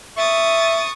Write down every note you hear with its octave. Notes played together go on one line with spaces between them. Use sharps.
E5 C#6 D#6 A6